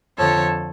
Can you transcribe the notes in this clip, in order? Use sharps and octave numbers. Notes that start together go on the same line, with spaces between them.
F2 D3 F3 A4 C#5